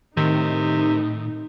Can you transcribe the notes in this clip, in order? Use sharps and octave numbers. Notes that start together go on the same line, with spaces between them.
A2 C3 D#3 D#4